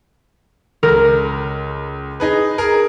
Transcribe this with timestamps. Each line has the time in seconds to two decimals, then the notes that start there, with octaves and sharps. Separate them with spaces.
0.83 C#2 A#4
2.20 D#4 G#4 B4
2.58 G#4 A#4